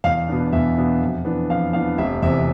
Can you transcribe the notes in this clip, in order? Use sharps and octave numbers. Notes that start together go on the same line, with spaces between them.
E2 F5
B2 B3 D4
E2 E5
B2 B3 D4
F2
E3 B3 D4
F2 F5
E3 B3 D4 F5
F1 E5
E2 C3 E5